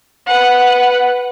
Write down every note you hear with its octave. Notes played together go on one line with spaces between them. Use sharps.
B4 F#5